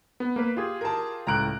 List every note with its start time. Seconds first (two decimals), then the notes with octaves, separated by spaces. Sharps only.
0.20 B3
0.36 A#3 B4
0.57 F4 G4 G#4
0.81 A#4 A5
1.27 C#2 A2 A#5 F#6 D7